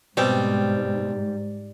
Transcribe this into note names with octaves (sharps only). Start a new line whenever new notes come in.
G#2 B2 G3 C4